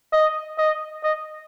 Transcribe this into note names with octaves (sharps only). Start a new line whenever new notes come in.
D#5
D#5
D#5